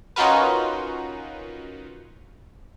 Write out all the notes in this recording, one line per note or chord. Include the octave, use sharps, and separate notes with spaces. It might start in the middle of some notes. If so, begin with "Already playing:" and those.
C#4 D#4 F4 F#4 A#4 B4